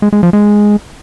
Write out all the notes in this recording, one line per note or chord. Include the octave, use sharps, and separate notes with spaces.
G#3
G#3
F3
G#3